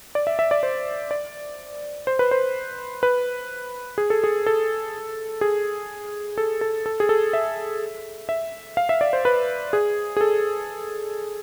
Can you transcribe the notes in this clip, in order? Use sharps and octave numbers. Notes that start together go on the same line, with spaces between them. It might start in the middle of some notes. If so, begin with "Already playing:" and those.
D5
E5
E5
D5
C5
D5
C5
B4
C5
B4
G#4
A4
G#4
A4
G#4
A4
A4
A4
G#4
A4
E5
E5
F5
E5
D5
C5
B4
G#4
G#4
A4